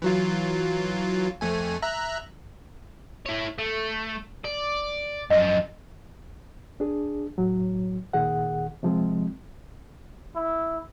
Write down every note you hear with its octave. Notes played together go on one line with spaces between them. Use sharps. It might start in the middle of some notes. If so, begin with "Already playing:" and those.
E3 F#3 F4
F2 A3 G#5
E5 A#5 F#6
E4 C#5
A3
D5
F#2 F3 D#5 E6
D4 G#4
A2 F#3
A#2 D#3 G#4 F#5
C3 F3 G#3 C4
E4